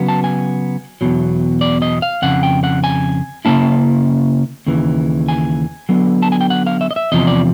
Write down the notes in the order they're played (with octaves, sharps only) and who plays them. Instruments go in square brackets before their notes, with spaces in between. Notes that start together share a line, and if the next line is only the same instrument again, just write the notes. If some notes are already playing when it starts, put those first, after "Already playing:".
Already playing: [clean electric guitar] C#3 F#3 B3
A5
G#5
E2 B2 F#3
D5
D#5
F5
F2 C#3 F#5
G5
F#5
G#5
C#3 F3 A#3 C#4 E4 A5
D#2 C#3 E3
G#5
D3 F#3 B3
A5
G#5
G5
F#5
F5
E5
D#5
E5
E2 C3 F3 D#5
D5